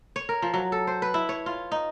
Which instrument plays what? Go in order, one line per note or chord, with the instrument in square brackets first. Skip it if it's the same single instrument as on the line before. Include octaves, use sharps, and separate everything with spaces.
[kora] C#5
A#4
F3
F#3
A4
C5
B4
E4
C#5
F4
D#4